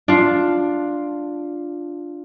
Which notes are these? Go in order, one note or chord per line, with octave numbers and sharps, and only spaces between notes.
D4 F4